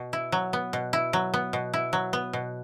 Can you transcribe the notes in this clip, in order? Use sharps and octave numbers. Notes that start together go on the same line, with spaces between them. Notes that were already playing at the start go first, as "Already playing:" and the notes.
Already playing: B2
E4
F#3
B3
B2
E4
F#3
B3
B2
E4
F#3
B3
B2